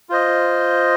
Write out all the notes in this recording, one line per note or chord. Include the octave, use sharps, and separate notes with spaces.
F4 C5 D#5